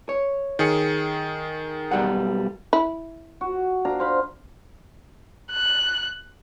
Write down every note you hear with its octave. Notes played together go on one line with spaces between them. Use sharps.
C#5
D#3 G#4 C#7
B1 G3 F#5
E4
F#4
D4 F5 A#5
C5 F5 B5
F#6